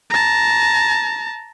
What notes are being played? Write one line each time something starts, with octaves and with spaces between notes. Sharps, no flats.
A5 A#5